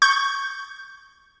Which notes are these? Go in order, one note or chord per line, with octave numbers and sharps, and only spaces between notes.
C#6 G6